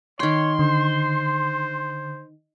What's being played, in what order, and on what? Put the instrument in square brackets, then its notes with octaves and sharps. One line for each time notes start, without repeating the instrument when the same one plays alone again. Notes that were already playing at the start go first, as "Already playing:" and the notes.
[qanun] D#3 G5 [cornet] C#5 [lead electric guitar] C6
[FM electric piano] D3 [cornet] C5